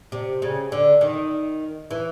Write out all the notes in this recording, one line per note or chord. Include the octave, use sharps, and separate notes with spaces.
C3
C#3
D3
D#3
E3